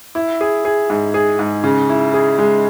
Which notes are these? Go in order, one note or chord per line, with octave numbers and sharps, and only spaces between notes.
E4
G#4
G#4
G#2
G#4
G#2
C#3
E4
G#4
G#3